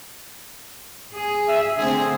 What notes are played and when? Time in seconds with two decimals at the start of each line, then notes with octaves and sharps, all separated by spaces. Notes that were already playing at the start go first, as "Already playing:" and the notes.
1.14 G#4
1.48 E5
1.78 D3 A3 C4 G#4